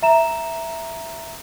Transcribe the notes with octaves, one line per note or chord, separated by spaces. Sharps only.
E5 A#5 E7